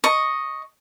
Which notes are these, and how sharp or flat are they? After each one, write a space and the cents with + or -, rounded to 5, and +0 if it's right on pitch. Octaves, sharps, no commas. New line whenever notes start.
D#5 +0 C#6 +0